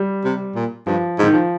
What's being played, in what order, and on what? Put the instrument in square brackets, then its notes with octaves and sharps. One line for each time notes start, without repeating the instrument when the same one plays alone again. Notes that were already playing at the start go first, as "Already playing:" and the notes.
Already playing: [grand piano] G3
[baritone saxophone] C3
A#2
[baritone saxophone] G2 [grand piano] F3
[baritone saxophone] G#2
[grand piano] D#3
F3